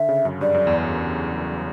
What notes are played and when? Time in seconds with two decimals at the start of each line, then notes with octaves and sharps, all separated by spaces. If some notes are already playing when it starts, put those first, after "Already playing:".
Already playing: D3 E5
0.09 C#3
0.25 F#2
0.41 G2 D5
0.54 F#2
0.67 E2